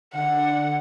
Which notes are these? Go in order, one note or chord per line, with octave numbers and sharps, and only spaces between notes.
D3 F#5